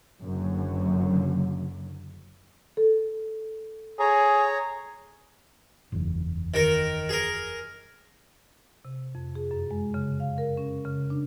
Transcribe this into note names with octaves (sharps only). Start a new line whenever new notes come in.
F#1 F#2 D3 F#3
A4
G#4 C#5 A#5
F#1 E2
D#3 A#4
G#4 A#4
C3
F2
G#4
F#2
G#3
C#3
F5
A#4
C#4
C#3
D4